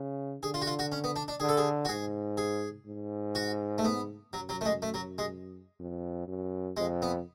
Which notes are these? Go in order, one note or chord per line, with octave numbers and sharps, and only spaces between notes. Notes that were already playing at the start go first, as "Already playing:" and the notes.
Already playing: C#3
D3 G#4
F4
F#4
F4
F#4
C#4
B3
D4
D4
D3 G#4
A4
G#4
F#4
G#2 G#4
G#4
G#2
F#4
A3
B3
F#2 F#3
F#3
A3
G#3
A3
F#3
G#3
F2
F#2
F2 G#3
B3